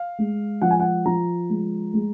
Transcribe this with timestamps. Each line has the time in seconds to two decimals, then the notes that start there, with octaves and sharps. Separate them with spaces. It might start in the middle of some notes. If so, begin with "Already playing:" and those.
Already playing: F5
0.18 G#3
0.61 F3 F#5
0.71 G#5
0.80 F#5
1.05 F3 A#5
1.49 G#3
1.94 G#3